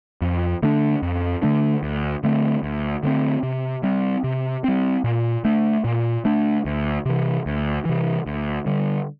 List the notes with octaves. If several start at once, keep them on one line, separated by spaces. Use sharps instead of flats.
F2
D3 A3 D4
F2
D3 A3 D4
D2
D3 A3 C4
D2
D3 A3 C4
C3
G3 C4
C3
G3 C4
A#2
A3 D4
A#2
A3 D4
D2
C3 E3
D2
C3 E3
D2
D3 G3